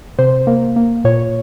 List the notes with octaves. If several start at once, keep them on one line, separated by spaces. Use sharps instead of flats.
C3 C5
A#3
A#3
A#2 C#5